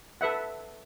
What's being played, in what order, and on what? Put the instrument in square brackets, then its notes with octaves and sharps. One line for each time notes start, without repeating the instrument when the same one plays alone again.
[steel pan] A4 B4 E5 F#5